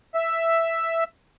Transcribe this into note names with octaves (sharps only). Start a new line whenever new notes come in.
E5